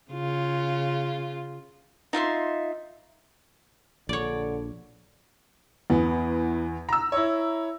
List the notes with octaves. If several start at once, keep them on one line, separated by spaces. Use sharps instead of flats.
C#3 F4
D#4 F4 E5 C6
A#1 D3 C#5 D5
E2 B3
A#5 E6
E4 C#5